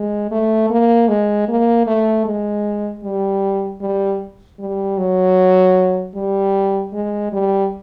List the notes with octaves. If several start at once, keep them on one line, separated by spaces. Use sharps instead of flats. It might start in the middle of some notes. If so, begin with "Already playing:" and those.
Already playing: G#3
A3
A#3
G#3
A#3
A3
G#3
G3
G3
G3
F#3
G3
G#3
G3